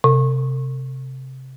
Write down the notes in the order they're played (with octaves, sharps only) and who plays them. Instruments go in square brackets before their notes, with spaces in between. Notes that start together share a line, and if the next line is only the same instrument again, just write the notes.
[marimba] C3